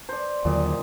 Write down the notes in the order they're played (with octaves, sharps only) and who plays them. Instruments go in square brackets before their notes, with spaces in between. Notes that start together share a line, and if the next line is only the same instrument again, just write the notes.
[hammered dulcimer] C5 D5
[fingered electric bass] D#2 D3 F#3 [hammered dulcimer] A#2 D#5